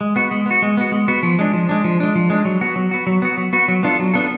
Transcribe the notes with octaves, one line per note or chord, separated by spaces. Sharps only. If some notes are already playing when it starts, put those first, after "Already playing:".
G#3
B3 F#4
G#3
B3 F#4
G#3
B3 F#4
G#3
B3 F#4
F3
G#3 D4
F3
G#3 D4
F3
G#3 D4
F3
G#3 D4
F#3
B3 F#4
F#3
B3 F#4
F#3
B3 F#4
F#3
B3 F#4
F#3
B3 D4 F4 A4
F#3
B3 D4 F4 A4